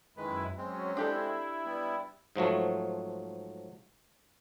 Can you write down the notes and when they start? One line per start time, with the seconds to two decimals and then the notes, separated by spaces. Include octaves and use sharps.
0.17 F#2 D#3 G#3 E4 B4
0.57 F#3 G#3 C4 C#4
0.97 D4 E4 G4 A4
1.65 G3 B3
2.36 G#2 F3 F#3 A3